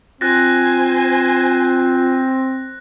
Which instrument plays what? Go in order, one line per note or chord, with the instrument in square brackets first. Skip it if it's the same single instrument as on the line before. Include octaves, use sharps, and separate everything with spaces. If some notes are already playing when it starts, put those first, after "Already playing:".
[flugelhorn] C4 [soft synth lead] F4 [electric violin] C5 G#5 [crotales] F#6 A6 A#6